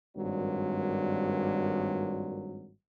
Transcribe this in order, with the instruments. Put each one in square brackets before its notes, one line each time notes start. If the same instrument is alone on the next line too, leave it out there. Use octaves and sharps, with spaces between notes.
[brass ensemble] G#1 G2 A#2 F#3